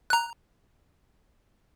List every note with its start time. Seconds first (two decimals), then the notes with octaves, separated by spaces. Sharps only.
0.10 A#5 F#6